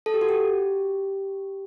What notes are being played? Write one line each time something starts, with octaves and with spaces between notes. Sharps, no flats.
A4
G4
F#4
G4